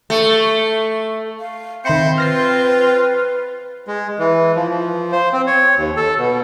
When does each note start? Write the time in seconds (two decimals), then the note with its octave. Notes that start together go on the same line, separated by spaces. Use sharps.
0.10 A3
1.39 F5
1.85 D#3 C4 C5 E5 B5 C#7
2.18 F4 B4 F6 A#6 C7
3.88 G#3
4.19 E3
4.55 F3
4.69 F3
5.12 C5
5.33 C4
5.47 C#5
5.77 D#2
5.97 A4
6.18 B2